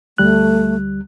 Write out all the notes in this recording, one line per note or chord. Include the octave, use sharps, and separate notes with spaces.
D2 G3 A3 F#6